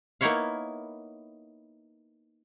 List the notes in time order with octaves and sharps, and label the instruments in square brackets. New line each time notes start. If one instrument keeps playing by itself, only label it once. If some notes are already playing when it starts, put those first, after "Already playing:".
[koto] A#3 B3 D#4 E4 C#5 F5